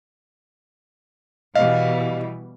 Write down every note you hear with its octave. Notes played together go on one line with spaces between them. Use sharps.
B2 E3 G3 D#5 F5